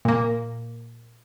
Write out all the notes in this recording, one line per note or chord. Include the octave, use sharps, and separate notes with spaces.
A#2 A#3